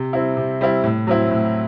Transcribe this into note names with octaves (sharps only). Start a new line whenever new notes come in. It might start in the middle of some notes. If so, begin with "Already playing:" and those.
Already playing: C3
G3 C4 E4
C3
G3 C4 E4
A2
F#3 C4 E4
A2